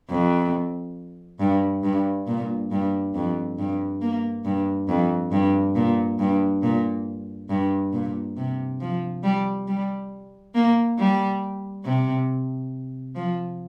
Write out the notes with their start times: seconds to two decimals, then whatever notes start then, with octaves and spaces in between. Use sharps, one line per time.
0.09 F2
1.40 G2
1.84 G2
2.27 A#2
2.71 G2
3.14 F2
3.58 G2
4.02 A#3
4.45 G2
4.89 F2
5.32 G2
5.75 A#2
6.19 G2
6.63 A#2
7.49 G2
7.93 A#2
8.37 C3
8.81 F3
9.23 G3
9.68 G3
10.55 A#3
10.98 G3
11.85 C3
13.16 F3